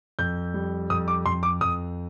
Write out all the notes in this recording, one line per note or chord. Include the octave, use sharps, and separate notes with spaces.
F2 G6
G3
F2 D#6
D6
F2 C6
D6
F2 D#6